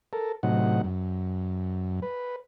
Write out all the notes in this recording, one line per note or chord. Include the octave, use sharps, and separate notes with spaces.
A4 A#4
A2 C3 F#3 D#4 F#5
F#2
B4